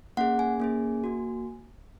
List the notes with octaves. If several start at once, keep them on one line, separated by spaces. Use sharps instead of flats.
A#3 C#4 G#4 F#5
G#5
A#3 C#4 G#4
A#3 F#4